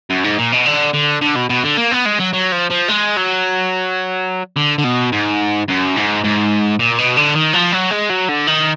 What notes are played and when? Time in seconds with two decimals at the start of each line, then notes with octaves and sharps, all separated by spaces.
0.10 F#2
0.24 G#2
0.38 A#2
0.52 B2
0.66 D3
0.94 D3
1.22 D3
1.36 B2
1.50 B2
1.64 D3
1.77 A#3
1.91 B3
2.05 G#3
2.19 F#3
2.33 F#3
2.52 F3
2.71 F3
2.89 G#3
3.17 F#3
4.56 D3
4.78 D3
4.84 B2
5.12 G#2
5.68 F#2
5.96 G#2
6.24 G#2
6.79 A#2
6.98 B2
7.17 D3
7.35 D#3
7.54 F3
7.73 F#3
7.91 G#3
8.09 F#3
8.28 D3
8.47 D#3